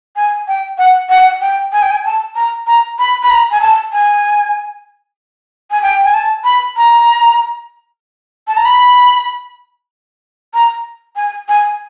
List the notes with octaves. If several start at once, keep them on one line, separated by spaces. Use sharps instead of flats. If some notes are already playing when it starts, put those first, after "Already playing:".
G#5
G5
F#5
F#5
G5
G#5
G5
G#5
A5
A#5
A#5
B5
B5
A#5
G#5
A5
G#5
G#5
G5
G#5
A5
B5
A#5
A5
A#5
B5
A#5
G#5
G#5